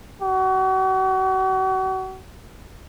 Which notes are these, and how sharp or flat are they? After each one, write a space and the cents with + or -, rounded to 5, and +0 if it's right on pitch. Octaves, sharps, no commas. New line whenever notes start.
F#4 +35